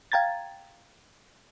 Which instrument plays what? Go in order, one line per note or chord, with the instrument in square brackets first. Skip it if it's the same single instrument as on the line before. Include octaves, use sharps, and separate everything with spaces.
[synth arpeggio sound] F5 G5 A#5 G#6 A6